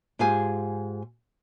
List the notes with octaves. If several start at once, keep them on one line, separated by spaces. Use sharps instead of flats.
G#2 F4 G4 G#4 G#5